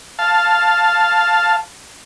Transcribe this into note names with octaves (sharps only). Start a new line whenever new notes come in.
F5 A5